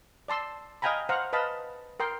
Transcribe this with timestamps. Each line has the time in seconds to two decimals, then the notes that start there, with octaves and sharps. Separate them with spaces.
0.28 D5 A5 C6 E6
0.82 D#5 F5 G5 G#5 A#5 B5
1.09 C5 F5 F#5 A#5
1.33 B4 D#5 F5 A5 B5
2.00 A#4 G5 C6